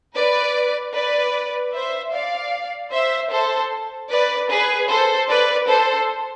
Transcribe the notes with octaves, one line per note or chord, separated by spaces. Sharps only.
B4 D5
B4 D5
C5 E5
D5 F5
C5 E5
A4 C5
B4 D5
G#4 B4
A4 C5
B4 D5
A4 C5